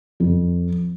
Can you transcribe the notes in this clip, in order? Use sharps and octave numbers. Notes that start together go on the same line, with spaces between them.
F2